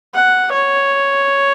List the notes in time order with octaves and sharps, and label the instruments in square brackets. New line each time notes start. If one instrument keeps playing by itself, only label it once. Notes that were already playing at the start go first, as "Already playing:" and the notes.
[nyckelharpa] F#5
C#5